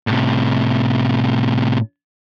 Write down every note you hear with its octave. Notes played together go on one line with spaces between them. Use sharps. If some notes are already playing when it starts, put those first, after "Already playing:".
A2 C3